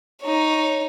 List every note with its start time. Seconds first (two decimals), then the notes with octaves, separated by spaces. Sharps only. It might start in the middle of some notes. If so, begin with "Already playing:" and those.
0.22 D#4 C#5